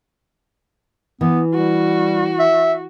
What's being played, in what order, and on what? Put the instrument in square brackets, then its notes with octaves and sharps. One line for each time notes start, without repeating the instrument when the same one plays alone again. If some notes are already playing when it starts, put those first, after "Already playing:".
[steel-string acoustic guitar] E3 [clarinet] B3
[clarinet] G3 [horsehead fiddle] F#4
[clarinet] E5